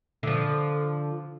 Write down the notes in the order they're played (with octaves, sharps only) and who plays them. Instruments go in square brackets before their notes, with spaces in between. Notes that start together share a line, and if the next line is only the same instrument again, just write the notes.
[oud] D3 F3